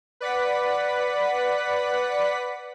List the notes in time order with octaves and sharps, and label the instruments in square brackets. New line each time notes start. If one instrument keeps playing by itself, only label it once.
[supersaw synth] B4 D5 F#5 B6